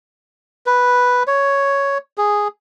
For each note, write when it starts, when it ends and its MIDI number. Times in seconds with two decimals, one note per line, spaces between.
0.66 1.23 71
1.27 1.98 73
2.18 2.48 68